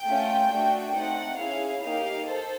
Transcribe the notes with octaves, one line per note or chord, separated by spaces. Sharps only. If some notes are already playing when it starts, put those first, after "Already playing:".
Already playing: G5
A3 C#4 F4
A3 D4 F#4
A3 C4 D#4 F#5
C#4 E4 G#4 F5
A#3 D#4 G4 F5
A4 C5